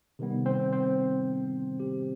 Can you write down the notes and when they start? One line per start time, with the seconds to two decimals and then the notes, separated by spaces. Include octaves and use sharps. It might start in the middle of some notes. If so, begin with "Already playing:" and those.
0.19 C3 D#3 G3 B3
0.46 C4 C5
0.73 C4 C5
1.80 G4